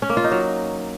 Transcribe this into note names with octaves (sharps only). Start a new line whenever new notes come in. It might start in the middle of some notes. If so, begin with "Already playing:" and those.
C#4
A#3
F4
D#4
F#3